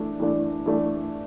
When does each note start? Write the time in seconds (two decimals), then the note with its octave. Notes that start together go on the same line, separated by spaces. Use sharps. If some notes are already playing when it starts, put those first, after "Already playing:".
Already playing: E3 A3 D4
0.20 E3 A3 D4
0.66 E3 A3 D4